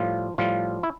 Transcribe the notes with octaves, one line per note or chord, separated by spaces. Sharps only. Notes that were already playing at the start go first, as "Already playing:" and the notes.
Already playing: A2 F3 G3 F4
A2 F3 G3 F4
E4